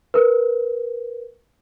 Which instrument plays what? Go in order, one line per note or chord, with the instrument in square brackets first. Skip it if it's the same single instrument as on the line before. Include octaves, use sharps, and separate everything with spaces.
[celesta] A#4 B4